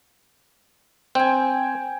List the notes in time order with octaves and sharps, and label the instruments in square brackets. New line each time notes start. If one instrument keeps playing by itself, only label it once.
[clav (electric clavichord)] C4 [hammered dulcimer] G5 G#5